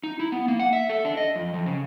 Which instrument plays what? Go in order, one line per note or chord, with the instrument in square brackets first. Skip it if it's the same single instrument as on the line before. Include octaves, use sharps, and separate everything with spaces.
[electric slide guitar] D#4
E4
B3
A#3
F#5
E5
A4
D4
D#5
F2
F2
C#3